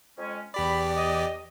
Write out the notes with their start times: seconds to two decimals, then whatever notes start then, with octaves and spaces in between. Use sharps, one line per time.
0.17 F2 G#3 C#4
0.54 E2 G4 D5 B5
0.96 D#5